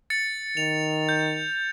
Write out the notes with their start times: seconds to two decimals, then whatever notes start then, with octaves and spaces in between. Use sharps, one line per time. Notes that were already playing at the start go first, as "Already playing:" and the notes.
0.10 A6 C#7
0.57 D#3 F7
1.09 G6